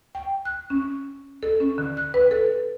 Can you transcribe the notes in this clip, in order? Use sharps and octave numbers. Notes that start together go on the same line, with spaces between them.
G5
F#6
C#4
A4
C#4
D3
F#6
B4
A4